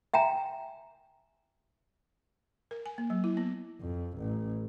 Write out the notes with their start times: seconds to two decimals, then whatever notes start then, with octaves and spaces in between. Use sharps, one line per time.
0.14 E5 G5 G#5 A#5
2.71 A#4
2.86 G#5
2.98 A#3
3.10 F#3
3.24 E4
3.37 B3
3.81 F2
4.18 A1